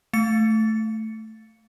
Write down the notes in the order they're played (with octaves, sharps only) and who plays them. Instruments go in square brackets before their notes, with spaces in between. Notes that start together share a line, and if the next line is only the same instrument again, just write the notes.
[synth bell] A3 A6 C#7